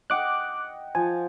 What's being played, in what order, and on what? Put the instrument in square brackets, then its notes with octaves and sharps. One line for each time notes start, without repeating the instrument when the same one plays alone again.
[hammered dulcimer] D#5 F#5 G5 [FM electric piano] D6 F#6
[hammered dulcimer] F3 [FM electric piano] G#5